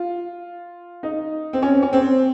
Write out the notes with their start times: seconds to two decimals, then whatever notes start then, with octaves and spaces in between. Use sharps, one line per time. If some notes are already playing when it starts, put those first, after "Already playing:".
Already playing: F4
1.03 D#4
1.53 C4
1.62 C#4
1.82 C#4
1.93 C4